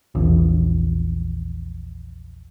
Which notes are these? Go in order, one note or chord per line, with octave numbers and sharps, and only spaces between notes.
A#1 E2